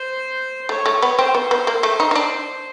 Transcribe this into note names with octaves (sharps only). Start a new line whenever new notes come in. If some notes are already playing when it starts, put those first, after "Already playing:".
Already playing: C5
A3 C#5
A3
B3
C4 C5
B3
B3
A#3
A3
D#4
D#4
D4